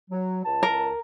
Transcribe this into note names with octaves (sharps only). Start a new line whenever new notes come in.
F#3
C#2 A5
A#4